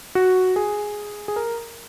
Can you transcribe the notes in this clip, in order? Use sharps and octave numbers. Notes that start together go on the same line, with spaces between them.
F#4
G#4
G#4
A#4